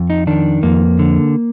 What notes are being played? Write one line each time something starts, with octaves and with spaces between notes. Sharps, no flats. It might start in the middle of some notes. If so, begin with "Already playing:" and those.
Already playing: F2
D#4
D#3 D4
F2 A#3
D3